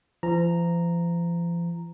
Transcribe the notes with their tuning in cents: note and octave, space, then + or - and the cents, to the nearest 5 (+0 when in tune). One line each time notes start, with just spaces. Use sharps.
F3 -40 A#5 -5